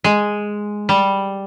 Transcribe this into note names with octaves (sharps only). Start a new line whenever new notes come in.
G#3
G3